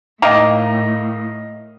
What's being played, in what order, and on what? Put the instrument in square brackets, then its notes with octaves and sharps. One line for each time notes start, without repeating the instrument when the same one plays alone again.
[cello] A2 [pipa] D#3 A#3 [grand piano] D#5 F5